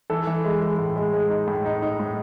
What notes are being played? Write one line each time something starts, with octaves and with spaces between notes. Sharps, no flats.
E3 A4
E3
G#3
G#3
A2
G#3
G#3
D#4
A2
D#4
D#4
A2